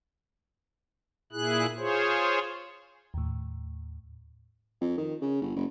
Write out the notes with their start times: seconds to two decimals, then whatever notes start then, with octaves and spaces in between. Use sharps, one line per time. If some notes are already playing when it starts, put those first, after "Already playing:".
1.32 A#2 E4 G#4 F#6
1.78 F4 G#4 C5 C#5
3.14 D#2 A2
4.81 F2
4.98 D#3
5.21 C#3
5.41 G1
5.56 F#1